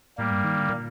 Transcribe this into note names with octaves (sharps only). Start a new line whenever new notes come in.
A2 G3 A#3
G2
D#3
D3
A#2